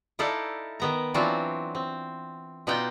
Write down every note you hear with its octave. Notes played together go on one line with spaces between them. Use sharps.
D#4 E4 A4 D5 F5
D#3 B3 A#5
E3 F#3 C4 D4 F4 F#4
C4
B2 D#4 F4 D5 F#5 G5